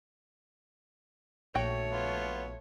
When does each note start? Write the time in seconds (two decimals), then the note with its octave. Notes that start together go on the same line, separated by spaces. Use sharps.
1.55 A#1 A3 F#4 C#5 G5
1.91 B3 F4